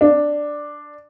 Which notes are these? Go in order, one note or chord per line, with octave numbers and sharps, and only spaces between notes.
D4